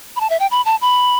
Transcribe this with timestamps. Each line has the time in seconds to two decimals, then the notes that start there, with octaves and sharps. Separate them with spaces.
0.16 B5
0.20 A5
0.30 E5
0.40 G5
0.51 B5
0.65 A5
0.81 B5